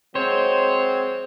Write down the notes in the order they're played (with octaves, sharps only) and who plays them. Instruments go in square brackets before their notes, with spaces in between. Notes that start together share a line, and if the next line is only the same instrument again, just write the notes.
[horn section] F#3 G#3 C4 [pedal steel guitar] C5 [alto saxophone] C#5